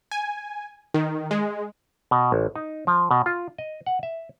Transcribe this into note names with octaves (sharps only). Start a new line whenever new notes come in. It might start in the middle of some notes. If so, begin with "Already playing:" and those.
G#5
D#3
G#3
B2
A1
D#4
F3
B2
F4
D#5
F#5
E5